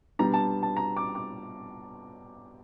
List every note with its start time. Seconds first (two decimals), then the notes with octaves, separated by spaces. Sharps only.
0.19 B2 G3 B3 D4 A#5
0.34 A5
0.63 A5
0.77 A#5
0.97 D6
1.15 D6